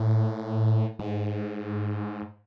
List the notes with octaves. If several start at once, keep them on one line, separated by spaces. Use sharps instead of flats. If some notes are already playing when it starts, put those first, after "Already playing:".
Already playing: A2
G#2